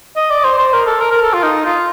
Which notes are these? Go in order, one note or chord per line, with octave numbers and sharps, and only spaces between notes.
D#5
D5
C5
C5
A#4
A4
A#4
A#4
A4
F4
D#4
F4